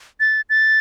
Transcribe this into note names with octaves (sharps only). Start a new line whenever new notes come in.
A6
A6